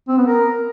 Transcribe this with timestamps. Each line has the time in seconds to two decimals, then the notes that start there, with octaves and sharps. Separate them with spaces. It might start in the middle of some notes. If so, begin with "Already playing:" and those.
0.08 C4
0.18 B3
0.28 A#4